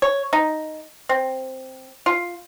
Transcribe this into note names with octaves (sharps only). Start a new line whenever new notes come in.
C#5
D#4
C4
F4